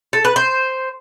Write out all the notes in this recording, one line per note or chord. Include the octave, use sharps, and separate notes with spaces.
A4
B4
C5